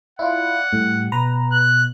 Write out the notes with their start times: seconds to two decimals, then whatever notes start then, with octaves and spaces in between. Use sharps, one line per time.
0.19 E4 F4 D5 F#5
0.73 A2 G3
1.12 B2 B4 A#5
1.52 F#6